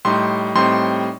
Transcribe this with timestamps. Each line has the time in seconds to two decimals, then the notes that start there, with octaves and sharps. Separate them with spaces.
0.05 A2 G3 D#4 C6
0.55 A2 G3 C4 D#4 C6